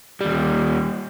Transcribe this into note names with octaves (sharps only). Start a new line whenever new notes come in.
D#2 G3